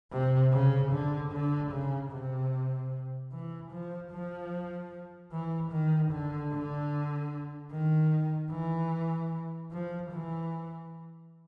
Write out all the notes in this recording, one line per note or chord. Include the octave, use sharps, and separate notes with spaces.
C3
C#3
D3
D3
C#3
C3
E3
F3
F3
E3
D#3
D3
D3
D#3
E3
F3
E3